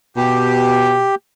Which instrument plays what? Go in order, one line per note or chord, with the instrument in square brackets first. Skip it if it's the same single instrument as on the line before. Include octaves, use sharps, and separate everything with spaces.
[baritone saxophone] B2 [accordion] G4